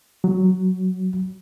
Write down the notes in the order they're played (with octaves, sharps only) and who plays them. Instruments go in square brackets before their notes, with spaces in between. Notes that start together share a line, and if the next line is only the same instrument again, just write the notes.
[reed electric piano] F#3